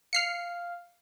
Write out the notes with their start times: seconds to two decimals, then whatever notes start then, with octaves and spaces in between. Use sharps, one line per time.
0.13 F5 F6 C7 C#7